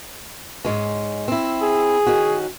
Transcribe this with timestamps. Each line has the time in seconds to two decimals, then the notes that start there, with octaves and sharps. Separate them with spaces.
0.65 G#2 G#3 C#4
1.28 C4 E4
1.62 G#4
2.06 D#3 C#4 F#4